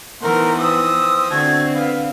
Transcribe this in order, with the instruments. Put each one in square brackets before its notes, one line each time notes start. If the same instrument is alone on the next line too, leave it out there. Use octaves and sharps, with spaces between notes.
[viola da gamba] E3 B3 D#4 [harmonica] A3 C5 F#5 [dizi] A#4
[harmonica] F3 C4 D#6 [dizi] E6
[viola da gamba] D3 C4 [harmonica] A3 F#4 A4 [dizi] G#6
[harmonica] B3 [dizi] F5